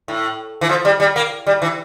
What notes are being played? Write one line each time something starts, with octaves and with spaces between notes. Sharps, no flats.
A2
E3
F3
G3
G3
A#3
G3
E3